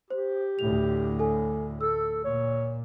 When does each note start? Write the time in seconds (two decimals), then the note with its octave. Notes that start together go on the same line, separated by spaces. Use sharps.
0.10 G4 C5
0.59 D2 A2 F7
1.19 A4 G#5
1.81 A4 E6
2.24 A#2 C#5